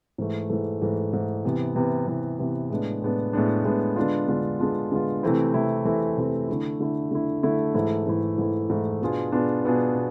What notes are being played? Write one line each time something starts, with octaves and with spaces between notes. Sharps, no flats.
G#2 E3 A3
G#2 E3 A3
G#2 E3 A3
G#2 E3 A3
C3 E3 B3
C3 E3 B3
C3 E3 B3
C3 E3 B3
A2 G#3 B3 D4
A2 G#3 B3 D4
A2 G#3 B3 D4
A2 G#3 B3 D4
D3 G#3 B3 D4 F4
D3 G#3 B3 D4 F4
D3 G#3 B3 D4 F4
D3 G#3 B3 D4 F4
C3 E3 A3 C4 E4
C3 E3 A3 C4 E4
C3 E3 A3 C4 E4
C3 E3 A3 C4 E4
D3 A3 E4
D3 A3 E4
D3 A3 E4
D3 A3 E4
G#2 E3 A3 E4
G#2 E3 A3 E4
G#2 E3 A3 E4
G#2 E3 A3 E4
B2 B3 D4 F4 G#4
B2 B3 D4 F4 G#4
B2 B3 D4 F4 G#4
B2